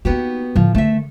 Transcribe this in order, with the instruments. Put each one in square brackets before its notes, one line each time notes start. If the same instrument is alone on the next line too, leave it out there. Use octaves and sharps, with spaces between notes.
[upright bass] A#3 D#4 [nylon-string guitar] B3 F#4 G4
[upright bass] A2 D3 [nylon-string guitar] F3
[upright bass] D3 D#3 [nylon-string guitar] A3 E5